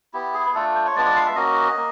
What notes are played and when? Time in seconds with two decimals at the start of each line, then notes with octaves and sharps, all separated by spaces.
0.14 B3 E4 G4
0.34 G#4
0.54 A3 D4 F4 A4
0.75 C5
0.85 C#5
0.95 G#3 B3 D4 F4 D5
1.06 D5
1.16 F5
1.26 E5
1.36 A#3 C#4 F#4 D#5
1.76 A#3